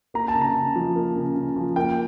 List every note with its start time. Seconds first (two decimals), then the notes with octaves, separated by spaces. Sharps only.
0.14 A#3 A#5
0.28 A5
0.34 C#3
0.41 A#5
0.55 C#3
0.76 F3
0.96 A#3
1.16 C#3
1.35 C#3
1.56 F3
1.76 A#3 G5